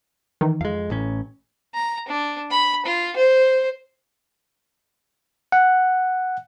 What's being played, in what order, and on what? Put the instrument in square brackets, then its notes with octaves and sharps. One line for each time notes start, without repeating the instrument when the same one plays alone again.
[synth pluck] D#3 E3 D#4
[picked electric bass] F2 G#3 [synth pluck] F5
[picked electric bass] A1 A2 C#4
[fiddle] A#5
D4
B5
F4
C5
[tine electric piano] F#5